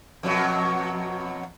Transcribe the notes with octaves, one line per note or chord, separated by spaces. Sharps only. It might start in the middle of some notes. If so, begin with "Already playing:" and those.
F2 B2 F#3